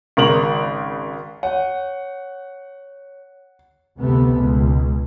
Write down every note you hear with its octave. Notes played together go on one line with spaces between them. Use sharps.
G#1 C#3 A#4 C#6 F#7
C#5 F#5
F1 D2 C3 A3 B3
C#2 B2